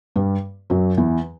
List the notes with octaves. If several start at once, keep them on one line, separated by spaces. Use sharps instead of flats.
G2 G3
F#2 F#3
E2 E3